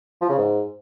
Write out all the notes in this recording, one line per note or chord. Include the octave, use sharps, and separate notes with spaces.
F3
C#3
G#2